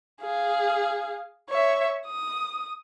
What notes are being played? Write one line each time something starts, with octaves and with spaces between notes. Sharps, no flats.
G#4 F5
C#5 E5
D#6